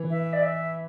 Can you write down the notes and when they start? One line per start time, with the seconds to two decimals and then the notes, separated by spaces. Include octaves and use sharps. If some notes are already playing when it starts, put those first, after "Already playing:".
Already playing: E3
0.10 E5
0.33 D5
0.43 E5